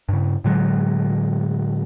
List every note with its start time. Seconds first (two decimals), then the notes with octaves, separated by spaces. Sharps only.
0.09 G2 C#3
0.44 A2 D3 F#3 G#3